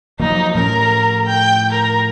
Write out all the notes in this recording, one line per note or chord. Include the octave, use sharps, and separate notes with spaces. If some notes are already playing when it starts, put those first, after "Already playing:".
F3 F#3 A#3 D#4
A2 F3 C#4 A#4
G5
A#4